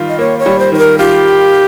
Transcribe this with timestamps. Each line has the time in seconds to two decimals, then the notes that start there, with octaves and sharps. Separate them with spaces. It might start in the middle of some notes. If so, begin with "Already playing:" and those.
Already playing: D#3 G3 F4
0.08 D#5
0.19 A#3 C#5
0.39 C#5
0.46 G3
0.59 C5
0.72 D#3 C5
0.78 A#4
0.98 F4 G4